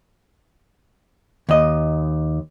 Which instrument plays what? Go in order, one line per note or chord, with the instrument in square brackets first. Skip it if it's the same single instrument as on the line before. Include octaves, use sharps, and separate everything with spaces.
[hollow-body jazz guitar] D#2 D#5